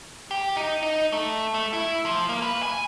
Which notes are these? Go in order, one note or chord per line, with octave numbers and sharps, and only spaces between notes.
G4
D#4
D#4
A3
A3
E4
F3
A#3
B4
G#5